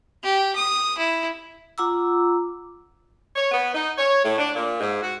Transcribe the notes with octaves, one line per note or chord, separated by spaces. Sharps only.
G4
D#6
E4
F4 F#5 A#5 D6 E6
C#5
B3
D#4
C#5
A2
D4
A#2
G#2
F#4